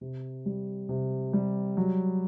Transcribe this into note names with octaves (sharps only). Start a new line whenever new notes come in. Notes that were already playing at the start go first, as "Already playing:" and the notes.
C3
G3
C3
G3
F#3